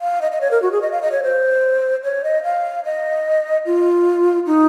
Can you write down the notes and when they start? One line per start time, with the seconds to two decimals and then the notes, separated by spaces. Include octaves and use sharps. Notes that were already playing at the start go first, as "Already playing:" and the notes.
0.01 F5
0.22 D#5
0.32 D#5
0.41 C#5
0.51 A#4
0.62 F#4
0.72 G#4
0.82 D#5
0.92 F5
1.02 D#5
1.12 C#5
1.23 C5
2.04 C#5
2.24 D#5
2.44 F5
2.85 D#5
3.66 F4
4.47 D#4